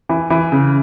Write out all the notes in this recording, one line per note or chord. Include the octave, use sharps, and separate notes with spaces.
E3
E3
C#3